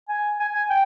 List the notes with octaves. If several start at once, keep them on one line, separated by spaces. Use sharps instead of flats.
G#5
G#5
G#5
G5